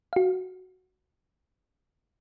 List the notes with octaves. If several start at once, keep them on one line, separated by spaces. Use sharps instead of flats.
F#4 F5